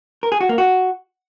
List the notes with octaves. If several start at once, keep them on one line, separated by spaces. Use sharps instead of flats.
A#4
G#4
F#4
A#3
F#4